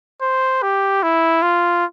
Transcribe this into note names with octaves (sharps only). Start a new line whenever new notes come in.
C5
G4
E4
F4